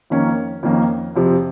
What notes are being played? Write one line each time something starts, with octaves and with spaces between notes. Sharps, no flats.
F2 D#3 A#3 C#4
F2 D#3 A#3 C#4
F2 C3 F3